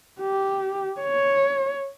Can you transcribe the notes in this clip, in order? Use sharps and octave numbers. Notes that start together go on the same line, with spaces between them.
G4
C#5